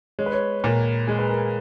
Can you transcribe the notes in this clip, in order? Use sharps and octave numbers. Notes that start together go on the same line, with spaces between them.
G#3 C#5
B4
C#5
A#2 A#4
G#3 G#4
B4
A#4